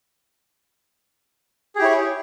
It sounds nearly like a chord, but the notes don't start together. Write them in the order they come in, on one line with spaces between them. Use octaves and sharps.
G#4 G4 E4 C#5